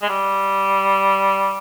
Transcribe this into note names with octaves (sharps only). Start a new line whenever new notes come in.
G#3
G3